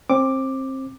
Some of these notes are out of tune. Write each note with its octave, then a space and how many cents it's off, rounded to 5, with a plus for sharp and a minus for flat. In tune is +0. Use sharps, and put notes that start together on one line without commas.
C4 +25 D6 +5